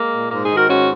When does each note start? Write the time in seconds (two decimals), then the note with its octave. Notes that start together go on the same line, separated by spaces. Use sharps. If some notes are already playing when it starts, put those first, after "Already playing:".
Already playing: G#3 A#3
0.12 A#2
0.31 G#2 A#3
0.44 D#4 G#4
0.50 D#3
0.56 F#4 A#4
0.69 G#2 C#4 F#4